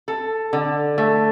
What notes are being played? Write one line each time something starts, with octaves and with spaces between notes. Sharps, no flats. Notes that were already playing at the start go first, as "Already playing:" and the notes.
A4
D3
A3